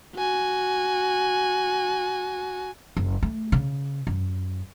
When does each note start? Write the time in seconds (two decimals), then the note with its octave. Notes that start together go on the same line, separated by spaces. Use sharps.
0.16 F#4 G#5
2.97 F#1
3.23 A3
3.52 C#3
4.07 F#2